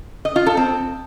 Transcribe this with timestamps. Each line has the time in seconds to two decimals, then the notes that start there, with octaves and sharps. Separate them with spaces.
0.25 D#5
0.36 F4
0.46 A4
0.57 C4